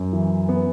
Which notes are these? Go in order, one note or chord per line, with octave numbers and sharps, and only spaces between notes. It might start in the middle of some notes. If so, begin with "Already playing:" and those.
Already playing: F#2
E3
B3